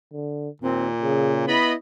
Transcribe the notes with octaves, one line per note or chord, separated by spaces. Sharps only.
D3
D#2 A#2 C4
C#3 G#4
B3 E4 D#5 B5